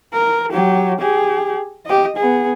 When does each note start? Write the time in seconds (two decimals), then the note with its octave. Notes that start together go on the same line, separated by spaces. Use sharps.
0.13 A#4
0.52 F#3 G4
1.00 G4 G#4
1.86 G4 D#5
2.17 B3 G#4